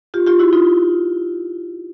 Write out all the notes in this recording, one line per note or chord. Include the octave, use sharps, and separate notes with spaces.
F4 G4
F4 G4
E4 F#4
D#4 F4